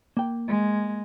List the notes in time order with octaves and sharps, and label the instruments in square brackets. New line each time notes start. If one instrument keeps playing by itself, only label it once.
[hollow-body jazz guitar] A#3 G5
[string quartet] G#3